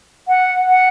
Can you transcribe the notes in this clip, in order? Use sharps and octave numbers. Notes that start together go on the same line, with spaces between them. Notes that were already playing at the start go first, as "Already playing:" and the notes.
F#5
F#5